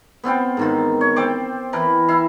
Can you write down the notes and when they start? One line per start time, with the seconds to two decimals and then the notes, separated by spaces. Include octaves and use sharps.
0.23 B3 C4 F4 G5
0.57 G#2 D#3 F4
1.01 C#5
1.16 C4 C5 G5 D6
1.73 E3 A#4 B4 A5
2.08 E4 F5